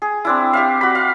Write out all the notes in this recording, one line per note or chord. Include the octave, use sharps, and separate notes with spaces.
G#4
C4 D4 E4
G4 E5 F5
F#4 B5
F5